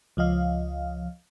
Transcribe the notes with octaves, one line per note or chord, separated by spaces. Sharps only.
C#2 F3 D#5 F5